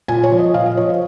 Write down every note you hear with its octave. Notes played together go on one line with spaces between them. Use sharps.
A#2 G#5
C#5
F3
D#5
A#2 F5
D#5
F3 C#5
C5